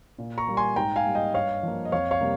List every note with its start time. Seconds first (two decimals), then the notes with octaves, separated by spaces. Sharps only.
0.18 A#2
0.38 A#5 C#6
0.48 G3 A#3
0.57 G#5 C6
0.76 G#2 G5 A#5
0.96 F5 G#5
1.05 G3 A#3
1.15 D#5 G5
1.34 G2 C#5 F5
1.63 F3 A#3
1.85 D#5
1.92 F2 C#5 F5
2.11 C#5 F5
2.21 C3 G3 A#3